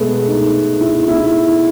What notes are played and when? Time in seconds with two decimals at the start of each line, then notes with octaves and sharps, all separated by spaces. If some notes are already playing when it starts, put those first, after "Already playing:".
Already playing: B2 G#3 A3 B3
0.28 D#4
0.81 E4
1.08 E4